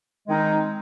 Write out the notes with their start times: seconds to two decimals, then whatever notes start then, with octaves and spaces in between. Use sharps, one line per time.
0.27 D#3 G#3 C4 D#4 A#4